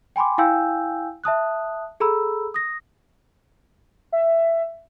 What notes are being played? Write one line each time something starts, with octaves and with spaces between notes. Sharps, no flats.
G5 G#5 B5 C6 D6
E4 F5 G5 G#5 E6 G6
E5 A5 D#6 F#6
G#4 A4 A#5 B5 E6
D#6 A#6
E5